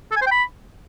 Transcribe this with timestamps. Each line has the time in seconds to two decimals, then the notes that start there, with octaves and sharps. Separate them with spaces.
0.12 A4
0.17 G#5
0.22 C5
0.27 G5
0.32 B5